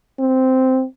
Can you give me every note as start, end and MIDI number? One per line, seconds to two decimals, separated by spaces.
0.19 0.84 60